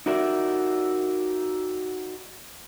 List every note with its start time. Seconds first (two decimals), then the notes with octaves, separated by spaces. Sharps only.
0.06 D#4 F#4 G4 A#4 D5 E5